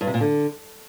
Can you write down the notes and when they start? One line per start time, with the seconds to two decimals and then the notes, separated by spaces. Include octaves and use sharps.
0.01 G2
0.07 C3
0.14 A#2
0.20 D3